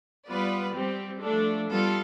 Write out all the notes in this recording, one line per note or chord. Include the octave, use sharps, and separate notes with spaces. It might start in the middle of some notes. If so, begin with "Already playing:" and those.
G3 B3 F4 B4 D5
G3 C4 G4
F3 A3 D4 A4
G3 B3 F4 A4